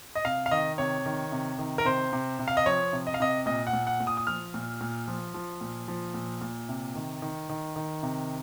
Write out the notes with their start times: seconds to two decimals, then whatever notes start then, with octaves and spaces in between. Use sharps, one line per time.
0.15 D#5
0.25 C3 F5
0.46 F5
0.51 D#3 D#5
0.78 C3 C#5
1.06 D#3
1.32 C3
1.58 D#3
1.78 A#4
1.85 C3 C5
2.13 C3
2.39 C3
2.48 F5
2.57 D#5
2.66 F3 C#5
2.93 C3
3.07 D#5
3.14 F5
3.20 C3 D#5
3.46 A#2 D#5
3.67 F#5
3.73 A#2
3.87 F#5
4.00 A#2
4.07 D#6
4.17 D#6
4.27 F3 F6
4.54 A#2
4.81 A#2
5.08 F3
5.34 F3
5.61 A#2
5.88 F3
6.14 A#2
6.41 A#2
6.69 C3
6.95 D#3
7.22 D#3
7.49 D#3
7.76 D#3
8.03 C3